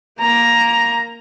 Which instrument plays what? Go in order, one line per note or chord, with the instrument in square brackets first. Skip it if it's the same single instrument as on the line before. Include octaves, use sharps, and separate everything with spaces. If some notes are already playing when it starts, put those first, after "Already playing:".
[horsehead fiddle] A#3 A#5